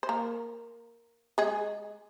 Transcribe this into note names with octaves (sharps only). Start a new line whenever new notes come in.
C5
A#3 A#4
G#3 G#4